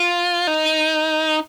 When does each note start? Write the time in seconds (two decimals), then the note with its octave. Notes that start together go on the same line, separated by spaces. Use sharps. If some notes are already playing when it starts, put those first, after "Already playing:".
Already playing: F4
0.47 D#4